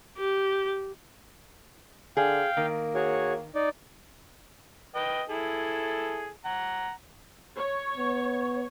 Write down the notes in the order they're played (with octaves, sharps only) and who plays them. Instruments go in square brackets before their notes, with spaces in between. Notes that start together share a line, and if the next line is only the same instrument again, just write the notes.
[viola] G4
[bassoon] D3 [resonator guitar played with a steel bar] G#4 [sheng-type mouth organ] F5 G5
[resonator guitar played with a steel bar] D#3 [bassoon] A#3
[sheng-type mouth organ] F#4 G#4 C#5
D#4 D5
[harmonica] B4 D#5 G5
E4 G#4 A4
F#5 A#5
[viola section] C#5
[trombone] B3